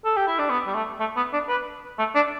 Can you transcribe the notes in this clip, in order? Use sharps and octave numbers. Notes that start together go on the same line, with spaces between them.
A4
G4
E4
D4
B3
G3
A3
A3
B3
D4
B4
A3
D4